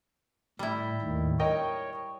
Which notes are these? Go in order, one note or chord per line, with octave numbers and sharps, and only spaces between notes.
A2 G3 E4
D#2 A2 D#3
A#4 C#5 D#5 G5